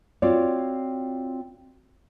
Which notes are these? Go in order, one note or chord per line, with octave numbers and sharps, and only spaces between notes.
C4 F4 F#4 C#5 D5